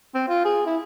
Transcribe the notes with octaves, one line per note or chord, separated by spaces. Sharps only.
C4
F4
G#4
E4